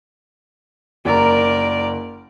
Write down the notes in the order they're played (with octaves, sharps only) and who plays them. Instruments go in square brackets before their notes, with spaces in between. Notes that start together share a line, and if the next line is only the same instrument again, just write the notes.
[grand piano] F#1 [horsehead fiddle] A#4 D5